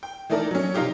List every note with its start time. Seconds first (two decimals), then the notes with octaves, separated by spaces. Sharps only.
0.03 G5
0.30 E3 A3 D#4 A4 A#4 D5
0.51 F#3 C#4
0.75 C3 F3 D#4 F4 G4